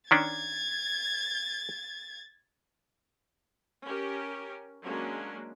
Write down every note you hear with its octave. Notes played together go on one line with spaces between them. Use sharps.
D#3 C#4 D4 G#6 A6
C#4 G4 A#4
F#3 G#3 A#3 C#4 D4